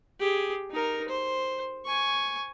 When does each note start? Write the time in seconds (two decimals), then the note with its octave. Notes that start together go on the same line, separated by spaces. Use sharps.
0.20 G4 G#4
0.71 D#4 A#4
1.08 C5
1.86 G#5 C#6